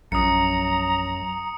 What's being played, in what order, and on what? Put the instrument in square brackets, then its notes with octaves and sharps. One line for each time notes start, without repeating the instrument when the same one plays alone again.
[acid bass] A#1 [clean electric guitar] F#2 [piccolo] A#5 [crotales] D#6 C#7